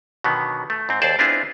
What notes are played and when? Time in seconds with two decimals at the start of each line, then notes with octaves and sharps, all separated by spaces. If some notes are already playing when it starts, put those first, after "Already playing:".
0.24 B2 D3 D#3 F#3 B3
0.70 A3
0.89 G#2 C4
1.02 D#2 G#4 C5 D5 A5
1.19 B3 C4 D4 E4 F4 G#4